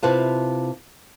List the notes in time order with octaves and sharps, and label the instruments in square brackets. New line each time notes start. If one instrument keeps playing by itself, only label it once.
[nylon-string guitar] C3 E4 F4 B4 F5 A5